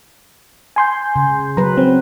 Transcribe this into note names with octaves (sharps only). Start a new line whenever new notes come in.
G#5 C6 G6
C#3
F#3 B4 A#5
C4